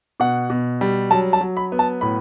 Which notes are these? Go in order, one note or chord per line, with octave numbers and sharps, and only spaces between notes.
B2 F#5
B2
G3
F#3 A5
A5
F#3
B5
B3
A5
A2 B5